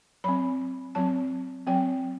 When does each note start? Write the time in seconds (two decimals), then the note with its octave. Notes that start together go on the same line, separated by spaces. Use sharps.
0.24 F#3 C4 B5
0.95 F#3 C4 A5
1.67 F#3 C4 G5